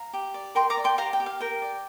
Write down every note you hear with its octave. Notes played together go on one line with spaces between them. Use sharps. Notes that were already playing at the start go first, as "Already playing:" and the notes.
Already playing: F5 A#5
G4
D5
A#4 G5 C6
A#5 D6
D5
G5 C6
G4 F5 A#5
G5
G4
F5
A#4 G5
D5